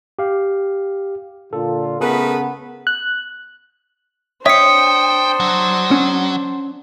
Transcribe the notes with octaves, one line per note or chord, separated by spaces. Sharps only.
G4 F5
A#2 D3 F4 A4
C#3 A3 B3 G#4 A#4 B4 F#5
F#6
D4 C5 C#5 E5 G5 D#6 C#7
F#3
C#4